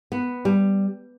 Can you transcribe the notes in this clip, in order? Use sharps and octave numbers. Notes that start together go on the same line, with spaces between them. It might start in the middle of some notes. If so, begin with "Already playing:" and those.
B3
G3